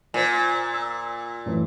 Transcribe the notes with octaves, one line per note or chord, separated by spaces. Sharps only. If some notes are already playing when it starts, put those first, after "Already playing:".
A#2 C5 G#5
E6
F#2 A2 E3